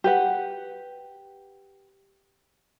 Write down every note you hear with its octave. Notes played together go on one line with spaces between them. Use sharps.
G4 B4 F#5